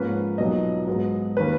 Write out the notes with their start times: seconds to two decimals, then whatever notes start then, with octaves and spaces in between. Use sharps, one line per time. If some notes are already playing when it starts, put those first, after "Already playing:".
Already playing: G#2 F3 A#3 C#4 B4
0.38 B1 A#2 F#3 B3 D#4 D#5
0.87 G#2 F#3 B3
1.37 D#3 A#3 C#4 B4